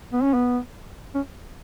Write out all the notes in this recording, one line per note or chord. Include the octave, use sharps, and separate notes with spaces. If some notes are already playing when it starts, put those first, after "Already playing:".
B3
C#4
B3
C#4